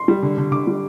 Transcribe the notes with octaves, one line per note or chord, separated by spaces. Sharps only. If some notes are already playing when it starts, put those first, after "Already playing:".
Already playing: C6
G3
D3
D3
D3 D6
G3